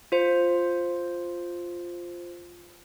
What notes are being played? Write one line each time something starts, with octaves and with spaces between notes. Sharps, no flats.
F4 C5